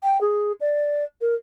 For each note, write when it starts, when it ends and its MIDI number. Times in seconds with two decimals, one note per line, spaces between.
0.02 0.20 79
0.20 0.52 68
0.60 1.04 74
1.21 1.34 70